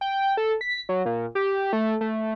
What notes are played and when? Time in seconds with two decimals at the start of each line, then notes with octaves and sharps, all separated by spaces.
0.01 G5
0.37 A4
0.61 B6
0.89 F#3
1.06 A#2
1.35 G4
1.73 A3
2.01 A3